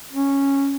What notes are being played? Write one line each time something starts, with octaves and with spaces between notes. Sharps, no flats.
C#4